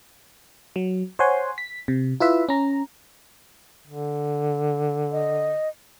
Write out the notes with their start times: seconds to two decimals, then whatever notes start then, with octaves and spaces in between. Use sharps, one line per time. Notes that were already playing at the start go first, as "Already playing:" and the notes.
0.76 F#3
1.19 C5 C#5 F#5 G#5 C6
1.58 B6
1.88 C3
2.20 E4 F4 B4 E5
2.49 C#4 A#5
3.87 D3
5.12 D#5